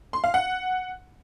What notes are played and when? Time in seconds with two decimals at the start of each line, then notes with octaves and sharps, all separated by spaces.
0.13 C6
0.24 F5
0.34 F#5